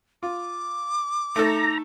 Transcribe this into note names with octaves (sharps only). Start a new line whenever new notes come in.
F4 D6
A3 D#4 A4 A#5